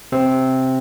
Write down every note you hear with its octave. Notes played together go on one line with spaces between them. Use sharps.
C3 C4